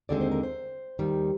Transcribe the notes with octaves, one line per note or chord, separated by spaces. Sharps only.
D#2 D3 G#3 C4 D5
C5
A#4
C5
D#2 D#3 G3